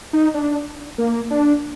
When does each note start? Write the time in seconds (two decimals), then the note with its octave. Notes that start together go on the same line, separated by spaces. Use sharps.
0.13 D#4
0.34 D4
0.98 A#3
1.30 D4